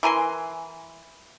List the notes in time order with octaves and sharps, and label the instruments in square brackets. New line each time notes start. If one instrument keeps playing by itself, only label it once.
[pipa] E3 A#4 G#5 C6